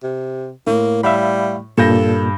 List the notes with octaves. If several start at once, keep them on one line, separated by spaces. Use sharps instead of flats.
C3
A2 A#3
G3 E5 F5 B5
G2 A#2 A4 G6 A#6